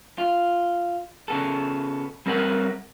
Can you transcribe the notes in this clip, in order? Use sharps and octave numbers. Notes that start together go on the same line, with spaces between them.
F4
C#3 B3 A4
G3 C4 A#4 B4 F#5